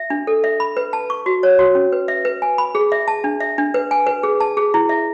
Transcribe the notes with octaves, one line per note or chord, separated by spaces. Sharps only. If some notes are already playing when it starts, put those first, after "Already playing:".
Already playing: E5
D4
A4
E5
B5
B4
A5
C#6
F#4
C#5
F#4
C#4
B4
E5
B4
G#5
B5
G#4
E5
A5
D4
E5
D4
B4
G#5
B4
G#4
A5
G#4
E4
E5